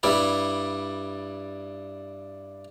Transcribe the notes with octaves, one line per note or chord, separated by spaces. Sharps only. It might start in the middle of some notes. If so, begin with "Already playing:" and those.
G2 G3 E4